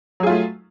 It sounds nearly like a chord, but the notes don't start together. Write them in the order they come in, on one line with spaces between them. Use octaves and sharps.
F#3 G#4 F4 A3